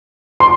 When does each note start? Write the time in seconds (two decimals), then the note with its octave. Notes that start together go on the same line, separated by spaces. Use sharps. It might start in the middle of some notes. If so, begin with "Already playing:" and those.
0.40 C6